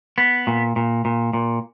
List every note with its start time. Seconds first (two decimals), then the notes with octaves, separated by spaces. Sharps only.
0.18 B3
0.47 A#2
0.76 A#2
1.05 A#2
1.33 A#2